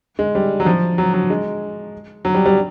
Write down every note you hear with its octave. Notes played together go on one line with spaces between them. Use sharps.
G#3
G3
F#3
F3
F#3
F#3
G#3
F#3
G3
G3